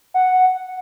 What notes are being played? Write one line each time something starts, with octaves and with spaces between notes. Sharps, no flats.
F#5